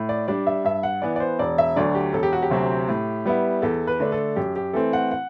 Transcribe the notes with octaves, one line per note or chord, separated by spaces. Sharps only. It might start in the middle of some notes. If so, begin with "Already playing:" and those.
Already playing: A2
D5
G3 D4 D5
E5
G2 E5
F#5
E3 B3 D5
D5
C5
E1 D5
E5
D2 D3 F#3 D5
G4
E1 A4
G4
F#4
G4
D2 C3 F#3 C4
A2
G3 B3 E4
E2 A4
B4
D3 A3 D4
A4
F#2 G4
G4
E3 A3 C4 A4
F#5
F#5